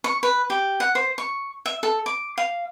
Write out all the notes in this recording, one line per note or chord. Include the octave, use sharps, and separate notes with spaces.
C#6
B4
G4
F#5
C5
C#6
E5
A4
D6
F5